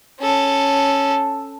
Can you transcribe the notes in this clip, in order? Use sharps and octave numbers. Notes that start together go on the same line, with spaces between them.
C#4 A4